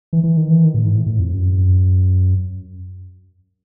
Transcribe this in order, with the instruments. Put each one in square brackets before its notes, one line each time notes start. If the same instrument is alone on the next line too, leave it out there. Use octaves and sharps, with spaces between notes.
[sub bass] E3
E3
D#3
E3
D#3
A2
G#2
A2
A2
F2
F#2